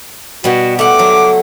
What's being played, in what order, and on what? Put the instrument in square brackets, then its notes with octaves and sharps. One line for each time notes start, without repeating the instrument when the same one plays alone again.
[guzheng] B2 G3 [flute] F#4
[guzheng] A3 F#5 [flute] D6
[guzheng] F#3